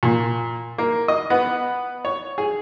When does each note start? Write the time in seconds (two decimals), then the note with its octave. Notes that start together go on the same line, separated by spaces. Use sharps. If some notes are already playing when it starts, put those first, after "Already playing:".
0.03 A#2
0.78 A#3
1.08 D#5
1.30 B3
2.05 C#5
2.38 G#4